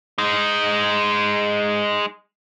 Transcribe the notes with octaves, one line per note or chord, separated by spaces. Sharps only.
G#3 D#4